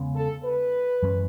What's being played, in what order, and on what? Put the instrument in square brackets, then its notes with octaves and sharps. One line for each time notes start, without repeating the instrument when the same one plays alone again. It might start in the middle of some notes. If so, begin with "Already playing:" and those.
Already playing: [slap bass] E2 C#3 G#3 B3
[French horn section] A4
B4
[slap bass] F#2 E3 G#3 C#4